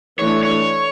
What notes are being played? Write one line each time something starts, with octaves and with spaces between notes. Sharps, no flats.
E3 A3 D4 C#5
C#5